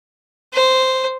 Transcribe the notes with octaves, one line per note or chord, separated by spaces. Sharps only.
C5